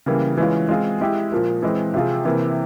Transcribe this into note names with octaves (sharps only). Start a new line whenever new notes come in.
C#3 E3 G3 A#3
E3 G#3 C#4 F4
G#3 C4 F4 G#4
G#3 E4 G4
A#2 F3 A#3
E3 G#3 C4
C3 F3 C4 F4 G#4
C3 E3 A#3